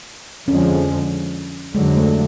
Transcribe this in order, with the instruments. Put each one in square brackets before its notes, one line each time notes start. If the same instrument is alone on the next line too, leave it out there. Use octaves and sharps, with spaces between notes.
[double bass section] F2 D3 F3 G#3 [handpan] C#4
[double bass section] F2 D3 F#3 [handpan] G#3
[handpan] A3